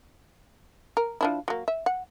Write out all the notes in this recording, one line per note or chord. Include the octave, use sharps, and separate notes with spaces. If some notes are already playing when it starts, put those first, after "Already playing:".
A#4
F3 D4 E4
F#3 A#3
E5
F#5